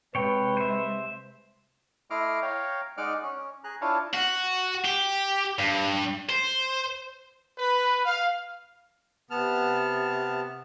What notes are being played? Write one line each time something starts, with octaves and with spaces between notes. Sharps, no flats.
C3 G#3 B4 C#5 G5
C5 E5
A3 E4 D#5 C6 D6 F6
C#5 F5 G5 A#5
G#3 D#4 D5 F#5 D6 F6
C#4
G#4 A#5 F#6
D4 E4 F4 C#5 F5 A5
F#4
G4
G2
C5
B4
F5
C3 B3 A5 F6